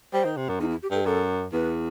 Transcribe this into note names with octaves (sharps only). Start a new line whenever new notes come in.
G3 C5
D#3
C3
F#2
E2 D#4
E4
G4
G2 A4
F#2 A4
E2 B4